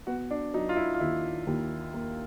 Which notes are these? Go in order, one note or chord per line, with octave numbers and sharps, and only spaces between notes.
B3 F#4
D4
F#3 D#4
F4
E4
F4
D#2 E4
D#2
A#3